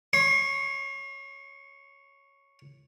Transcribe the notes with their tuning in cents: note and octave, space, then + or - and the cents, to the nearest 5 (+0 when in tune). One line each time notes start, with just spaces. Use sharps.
C#5 +0 C6 +40